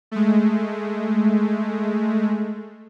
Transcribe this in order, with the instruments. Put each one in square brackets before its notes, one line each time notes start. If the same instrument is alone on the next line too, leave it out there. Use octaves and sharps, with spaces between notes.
[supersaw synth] G#3 A3